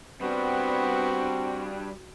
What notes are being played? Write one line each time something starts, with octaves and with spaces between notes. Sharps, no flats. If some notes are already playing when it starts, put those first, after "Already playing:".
G3 B3 C4 D4 F#4